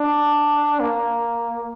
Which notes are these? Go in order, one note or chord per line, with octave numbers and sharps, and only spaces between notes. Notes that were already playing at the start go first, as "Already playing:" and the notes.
Already playing: D4
A#3